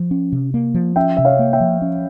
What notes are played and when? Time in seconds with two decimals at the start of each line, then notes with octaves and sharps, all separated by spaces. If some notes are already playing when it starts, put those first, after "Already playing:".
Already playing: F3
0.11 C#4
0.32 C3
0.54 A#3
0.74 F3
0.96 C#4 E5 G5
1.17 C3 E5
1.25 C#5 F5
1.39 A#3
1.53 E5 G5
1.60 F3
1.82 C#4